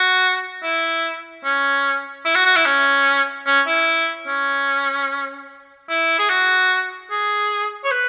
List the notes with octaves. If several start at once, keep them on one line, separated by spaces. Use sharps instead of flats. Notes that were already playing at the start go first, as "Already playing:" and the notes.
Already playing: F#4
E4
C#4
E4
F#4
F#4
E4
C#4
C#4
E4
C#4
E4
G#4
F#4
G#4
C#5
B4